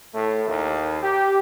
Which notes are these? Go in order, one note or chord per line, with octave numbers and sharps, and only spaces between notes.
A2
D#2
G4